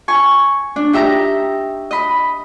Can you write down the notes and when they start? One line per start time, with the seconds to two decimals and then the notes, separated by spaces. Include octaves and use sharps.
0.08 G#5 C#6
0.76 D4
0.93 D#4 G4 E5 A#5
1.91 D#5 B5